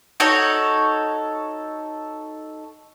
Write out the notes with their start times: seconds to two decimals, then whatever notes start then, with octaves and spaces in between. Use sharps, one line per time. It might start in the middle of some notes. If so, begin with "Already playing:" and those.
0.20 D#4 F#4 A4 C#5